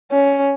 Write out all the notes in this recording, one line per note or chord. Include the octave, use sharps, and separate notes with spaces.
C#4